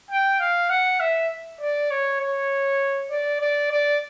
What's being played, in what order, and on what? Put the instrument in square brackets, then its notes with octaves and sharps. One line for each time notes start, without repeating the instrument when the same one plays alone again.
[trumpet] G5
F5
F#5
E5
D5
C#5
C#5
D5
D5
D5